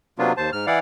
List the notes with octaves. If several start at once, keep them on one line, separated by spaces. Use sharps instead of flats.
C3 F#3 A#3 B3 D4 F4
D#2 C5 A5
G#2 F6
E3 E4 D5 F5 F#5